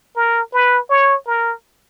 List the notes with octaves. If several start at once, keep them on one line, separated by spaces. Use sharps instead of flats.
A#4
B4
C#5
A#4